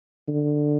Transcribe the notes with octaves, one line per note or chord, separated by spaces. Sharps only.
D3